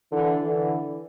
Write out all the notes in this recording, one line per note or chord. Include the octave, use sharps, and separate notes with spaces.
D3 E3
D3 E3